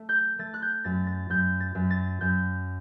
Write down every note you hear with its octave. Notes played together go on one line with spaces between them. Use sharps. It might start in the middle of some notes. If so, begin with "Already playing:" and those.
Already playing: A3
G6
A3 A6
F#6
G6
F#2 A6
A6
F#2 G6
A6
F#2
A6
F#2 G6